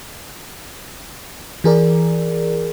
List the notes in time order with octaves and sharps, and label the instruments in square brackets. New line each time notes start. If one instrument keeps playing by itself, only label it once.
[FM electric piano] E3 G#4 A#4 D5